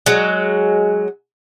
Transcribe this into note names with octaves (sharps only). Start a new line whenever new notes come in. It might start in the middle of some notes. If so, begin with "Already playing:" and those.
F#3 G#3